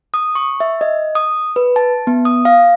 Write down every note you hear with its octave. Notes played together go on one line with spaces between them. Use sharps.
D#6
C#6
E5
D#5
D#6
B4
A5
B3
D#6
F5